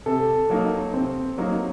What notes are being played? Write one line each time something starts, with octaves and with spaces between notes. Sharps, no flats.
C3 A4
F#3 A#3 D#4
C3 C4
F#3 A#3 D#4